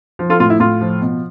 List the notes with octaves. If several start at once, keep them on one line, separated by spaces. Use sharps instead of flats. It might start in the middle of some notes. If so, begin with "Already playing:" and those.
F3
F4 A4
A2 F4
E4
A2 F4
F3
B2